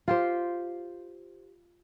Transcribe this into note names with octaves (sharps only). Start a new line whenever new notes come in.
F4 G4 C5